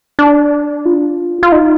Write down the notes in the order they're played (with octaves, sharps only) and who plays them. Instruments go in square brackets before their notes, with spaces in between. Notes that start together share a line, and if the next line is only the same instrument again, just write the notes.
[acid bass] D4
F4
F4
D#4